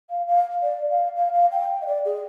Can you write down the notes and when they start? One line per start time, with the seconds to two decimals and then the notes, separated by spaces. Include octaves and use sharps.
0.10 F5
0.28 F5
0.62 D5
0.90 F5
1.16 F5
1.34 F5
1.52 G5
1.82 D#5
1.86 D5
2.05 G#4